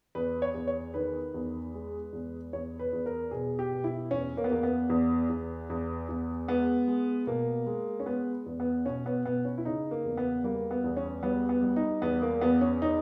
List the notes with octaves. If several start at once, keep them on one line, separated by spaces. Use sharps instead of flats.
E2 B4
C#5
E2
C#5
D#3 B4
E2
G#3
E2
E2 C#5
B4
E2
A#4
B2 G#4
G4
B2
E4
E2 C#4
A#3
B3
E2 A#3
B3
E2
E2
E2
E2
G#3 B3
G#3
B2 A#3
G#3
C#4
G#3 B3
E2
B3
B2 C#4
B3
B2 B3
C#4
E4
C#3 D#4
A#3
E2
B3
G3 A#3
B3
E2
C#4
G3 B3
B3
G3
D#4
E2 B3
A#3
E2 B3
C#4
D#4